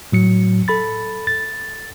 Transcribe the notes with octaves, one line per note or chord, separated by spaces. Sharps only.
A2 F#3 C#7
A4 B5 A6
A6